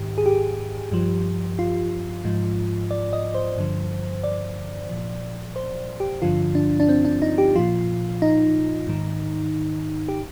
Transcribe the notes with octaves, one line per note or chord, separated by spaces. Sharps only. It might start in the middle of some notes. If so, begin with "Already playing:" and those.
Already playing: G#2 D#3 G4
G#4
G4
G2 F3
F4
G#2 F3
D5
D#5
C5
G2 D3 F3
D5
A#2 F3
C5
G4
G2 D3 F3 F4
D4
D4
C4
D4
D#4
G4
A#2 F3 F4
D#4
G#2 D#3
G4